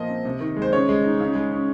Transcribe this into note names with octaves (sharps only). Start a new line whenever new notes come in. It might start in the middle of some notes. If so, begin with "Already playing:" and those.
Already playing: A#2 F3 A#3 D#5
C4
C3
D#3
G#3
C5
C#3 C#5
G#3
D#4
C#3
G#3
C#4